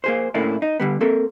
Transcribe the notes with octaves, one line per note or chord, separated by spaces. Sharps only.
A#3 G#4 C5
A2 A3 A#3 C#4 D4 E4
D#4
D3 G3 B3
A#3 C4 A4 A#4